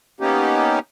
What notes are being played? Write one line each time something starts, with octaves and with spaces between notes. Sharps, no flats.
A#3 B3 C#4 D#4 G4